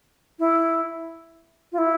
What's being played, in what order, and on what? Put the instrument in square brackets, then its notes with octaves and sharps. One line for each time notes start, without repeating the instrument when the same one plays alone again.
[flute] E4
F4
E4